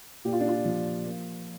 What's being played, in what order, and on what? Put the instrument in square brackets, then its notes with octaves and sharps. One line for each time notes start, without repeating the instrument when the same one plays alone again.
[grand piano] A#2 G4
F4
D4
F4
F3
A#3